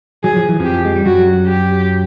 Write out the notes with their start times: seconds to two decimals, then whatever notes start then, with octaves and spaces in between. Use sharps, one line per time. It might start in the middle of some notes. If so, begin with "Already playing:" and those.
0.23 F#3 G#4
0.36 F3
0.48 E3
0.60 F2 F3 G4
0.85 G#3
0.96 G3
1.05 F#2 F#3 F#4
1.46 G4